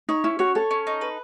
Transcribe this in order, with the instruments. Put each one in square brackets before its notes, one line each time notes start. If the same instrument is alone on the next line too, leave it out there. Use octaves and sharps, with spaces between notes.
[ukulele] D#4 [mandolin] C#5
[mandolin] C#4 [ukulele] E4
[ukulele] F#4 [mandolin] C#5
[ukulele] A4 [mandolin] C#5
[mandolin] C#4
D#4
B4